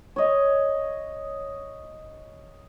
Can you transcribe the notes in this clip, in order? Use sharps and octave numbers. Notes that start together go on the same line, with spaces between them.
C#5 D#5